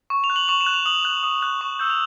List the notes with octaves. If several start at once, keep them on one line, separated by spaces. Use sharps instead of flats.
C#6
F7
F#6
F#7
C#6 F7
E7
F#6
F7
D#6 F#7
F#6
D#6
F#6
C#6
E6 G6
F7